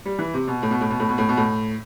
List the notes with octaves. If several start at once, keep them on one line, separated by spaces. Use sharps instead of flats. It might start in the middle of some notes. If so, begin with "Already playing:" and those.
G3
E3
C3
B2
A2
B2
A2
B2
A2
B2
A2
B2
A2